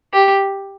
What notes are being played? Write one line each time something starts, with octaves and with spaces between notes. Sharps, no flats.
G4